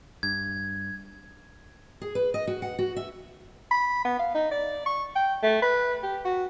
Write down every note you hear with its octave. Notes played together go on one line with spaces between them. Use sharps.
G2 G#6
G#4
B4
D#5
F#4
F#5
F#4
E5
B5
B3
F5
D#4
D5
C#6
G5
A3
B4
G4
F#4